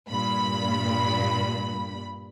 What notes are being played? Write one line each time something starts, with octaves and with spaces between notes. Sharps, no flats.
G2 A#2 B5